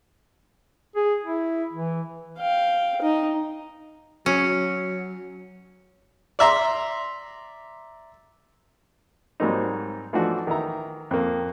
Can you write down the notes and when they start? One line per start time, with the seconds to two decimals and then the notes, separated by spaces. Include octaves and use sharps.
0.96 G#4
1.24 E4
1.73 E3
2.38 F5 G5
3.02 D#4
4.26 F#3 C#4 C#7
6.39 D5 E5 A#5 C6
9.40 G#2 F#3 G3 A#3 C4 D#4
10.13 E3 F3 A3 D4 D#4 F#4
10.47 D#3 E3 E5 A#5
11.11 F2 A#3